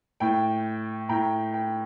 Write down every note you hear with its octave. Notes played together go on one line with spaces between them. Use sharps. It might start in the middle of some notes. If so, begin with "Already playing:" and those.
A2 G5
A2 G5 A#5
G5